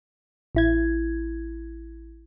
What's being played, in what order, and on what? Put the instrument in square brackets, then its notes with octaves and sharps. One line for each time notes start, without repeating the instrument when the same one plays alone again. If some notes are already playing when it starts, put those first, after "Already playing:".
[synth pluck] A1 E4 G#6